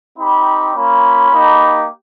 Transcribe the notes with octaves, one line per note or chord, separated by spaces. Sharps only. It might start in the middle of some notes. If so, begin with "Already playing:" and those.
C4 D#4 G4 B5
A#3 C#4 F4 B5
A#3 D#4 G4